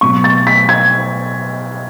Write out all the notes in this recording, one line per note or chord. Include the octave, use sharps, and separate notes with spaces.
B2 F#3 C#6
A6
B6
G#6